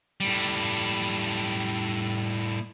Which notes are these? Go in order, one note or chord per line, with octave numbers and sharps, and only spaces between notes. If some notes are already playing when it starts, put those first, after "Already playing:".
A2 G3